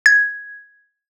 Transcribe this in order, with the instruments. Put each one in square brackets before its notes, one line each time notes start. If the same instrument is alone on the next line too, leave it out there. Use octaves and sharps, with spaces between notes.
[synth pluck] G#6